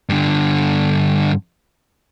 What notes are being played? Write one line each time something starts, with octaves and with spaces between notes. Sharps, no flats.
G2 D3